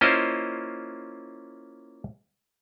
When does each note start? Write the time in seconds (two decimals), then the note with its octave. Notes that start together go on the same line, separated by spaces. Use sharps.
0.01 A#3 C#4 E4 F4 C5 D#5